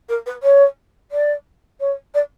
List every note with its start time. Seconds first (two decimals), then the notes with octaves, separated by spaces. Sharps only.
0.09 A#4
0.26 B4
0.43 C#5
1.11 D5
1.80 C#5
2.14 D5